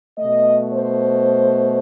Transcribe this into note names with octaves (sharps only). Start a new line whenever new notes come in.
B2 A3 D#5
C5